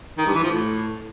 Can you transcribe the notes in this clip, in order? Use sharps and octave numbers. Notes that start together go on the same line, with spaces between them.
D#3
G2
E3
F3
A2